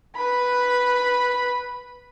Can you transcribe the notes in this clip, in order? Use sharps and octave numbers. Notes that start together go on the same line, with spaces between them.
B4 B5